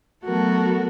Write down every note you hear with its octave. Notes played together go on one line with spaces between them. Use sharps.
F#3 A3 B3 F#4 A4 A#4